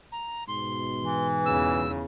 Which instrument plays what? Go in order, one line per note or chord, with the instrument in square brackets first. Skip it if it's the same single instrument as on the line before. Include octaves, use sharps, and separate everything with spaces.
[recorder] A#5
[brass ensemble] G#2 B2 [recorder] C6
[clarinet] E3
[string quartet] E2 C#3 [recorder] E6